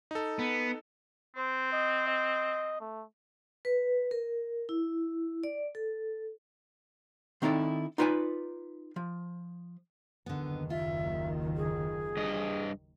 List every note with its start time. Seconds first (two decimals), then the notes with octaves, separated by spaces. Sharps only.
0.11 D#4 A4
0.39 B3
1.36 C4 C5
1.72 D#5
2.08 D#5
2.81 A3
3.65 B4
4.11 A#4
4.69 E4
5.43 D5
5.75 A4
7.42 D#3 C4 D#4 E4 A4 D5
7.98 D#4 F4 B4 D5 G5 G#5
8.96 F3
10.26 F#1 D#2 D3 D#3 B3
10.70 F4 E5
11.57 G#4
12.17 G2 D#5